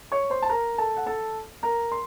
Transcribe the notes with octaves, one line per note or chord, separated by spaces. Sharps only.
C#5 C#6
C5 C6
A5
A#4 A#5
A4 A5
F#5
A4 A5
A#4 A#5
C6